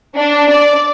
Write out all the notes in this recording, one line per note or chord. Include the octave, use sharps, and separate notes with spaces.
D4
D5